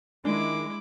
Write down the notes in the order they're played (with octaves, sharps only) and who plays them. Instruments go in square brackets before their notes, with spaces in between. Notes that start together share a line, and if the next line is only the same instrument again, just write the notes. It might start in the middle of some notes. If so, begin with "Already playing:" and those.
[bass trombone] D#3 [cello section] G#3 [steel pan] D4 [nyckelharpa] E4 D6